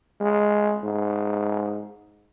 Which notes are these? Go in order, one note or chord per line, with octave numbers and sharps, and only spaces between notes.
G#3
G#2